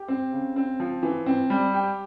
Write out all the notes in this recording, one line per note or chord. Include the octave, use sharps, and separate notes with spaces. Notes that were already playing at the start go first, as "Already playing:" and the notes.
Already playing: G4
C4
C#3
C4
F3
E3
C4
G3
G4